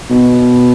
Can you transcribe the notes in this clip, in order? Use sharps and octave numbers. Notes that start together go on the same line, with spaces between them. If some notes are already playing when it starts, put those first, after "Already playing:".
B2